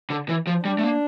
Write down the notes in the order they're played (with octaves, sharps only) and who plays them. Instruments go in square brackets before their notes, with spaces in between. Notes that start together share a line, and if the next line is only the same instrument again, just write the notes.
[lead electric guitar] D3
E3
F3
[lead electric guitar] G3 [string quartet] D4
[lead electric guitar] A3
A#3